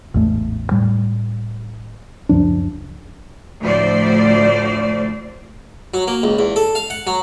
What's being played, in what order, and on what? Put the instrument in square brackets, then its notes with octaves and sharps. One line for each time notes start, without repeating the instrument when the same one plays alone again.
[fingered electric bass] A1 E2 G#2 A3
A2 G3
C#2 F#2 F3 D4
[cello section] D2 A2 F3 C5 D5
[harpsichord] F#3
A#3
C#2
E2
A4
F5
F#5
F#3